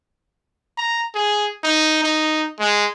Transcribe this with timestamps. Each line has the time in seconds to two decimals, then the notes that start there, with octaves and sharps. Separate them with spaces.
0.77 A#5
1.15 G#4
1.64 D#4
2.04 D#4
2.60 G#3